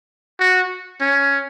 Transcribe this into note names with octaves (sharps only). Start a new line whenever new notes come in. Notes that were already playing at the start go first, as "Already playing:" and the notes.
F#4
C#4